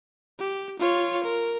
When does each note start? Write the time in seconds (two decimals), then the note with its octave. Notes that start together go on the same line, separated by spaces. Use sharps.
0.39 G4
0.79 F4 C#5
1.24 A#4